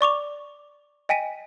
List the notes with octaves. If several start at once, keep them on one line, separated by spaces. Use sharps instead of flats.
D5 C#6 D6 F7
D#5 G5 G#5 B6 D#7